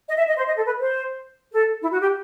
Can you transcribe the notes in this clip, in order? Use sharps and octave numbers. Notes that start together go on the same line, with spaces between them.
D#5
E5
D#5
C5
D#5
A4
B4
C5
A4
E4
F#4
G4